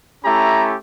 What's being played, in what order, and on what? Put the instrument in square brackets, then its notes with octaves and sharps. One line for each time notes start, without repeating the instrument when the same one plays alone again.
[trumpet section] A3 C#4 E4 G4 A#5